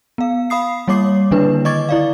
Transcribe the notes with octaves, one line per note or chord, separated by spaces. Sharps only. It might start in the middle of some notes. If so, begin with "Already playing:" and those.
B3 F5
F5 B5 D#6 C7
G3 A#3 C#5 D6 C7
D3 D#3 A#3 D4 E4 B4
D#5 C#6 D6 G#6 A6
E4 D5 F5